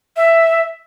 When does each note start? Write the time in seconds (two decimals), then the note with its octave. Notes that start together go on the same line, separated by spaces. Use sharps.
0.16 E5